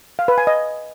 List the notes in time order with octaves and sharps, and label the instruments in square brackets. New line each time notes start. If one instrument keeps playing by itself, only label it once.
[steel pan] F5
B4
G#5
D#5